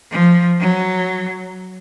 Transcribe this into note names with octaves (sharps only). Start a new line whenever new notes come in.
F3
F#3